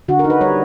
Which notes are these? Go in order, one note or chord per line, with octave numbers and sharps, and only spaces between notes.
D3 F#4
A#4
D#4
B4
G3 C#5